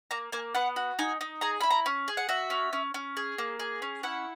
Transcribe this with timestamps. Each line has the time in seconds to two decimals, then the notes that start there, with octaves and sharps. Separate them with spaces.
0.11 A#3 A#5
0.32 A#3 G#5
0.55 B3 F#5
0.76 F#4
0.99 D#4 G#5
1.21 D#4
1.41 G#4 A#5
1.61 E4 B5
1.70 A#5
1.86 C#4
2.08 G#4
2.17 F#5
2.29 F#4 E5
2.50 C#4
2.73 C#4
2.94 C#4
3.17 G#4
3.38 A#3
3.59 G#4
3.82 C#4
4.03 E4 F#5